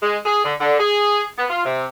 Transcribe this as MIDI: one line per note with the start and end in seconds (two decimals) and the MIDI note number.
0.02 0.17 56
0.25 0.41 68
0.43 0.53 50
0.60 0.75 50
0.78 1.23 68
1.37 1.45 59
1.49 1.65 65
1.65 1.85 48